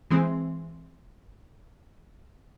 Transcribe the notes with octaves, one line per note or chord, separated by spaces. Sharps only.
E3 G#3 C4